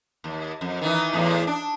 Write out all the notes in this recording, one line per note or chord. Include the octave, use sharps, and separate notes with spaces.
D#2
F2
D#3 E3 D#4
E2 A2 D#4
D4